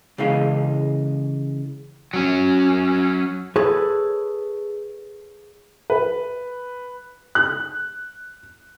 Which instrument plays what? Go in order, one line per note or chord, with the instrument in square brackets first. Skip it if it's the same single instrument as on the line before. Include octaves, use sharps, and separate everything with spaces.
[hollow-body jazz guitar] C#3 E3 G#3 C#4 F5
[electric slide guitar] F#3 C#4
[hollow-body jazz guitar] G#4 A4 B4 C#5
[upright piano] B4
[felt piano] F#6